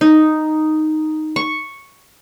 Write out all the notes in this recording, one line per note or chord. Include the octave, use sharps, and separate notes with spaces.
D#4
C#6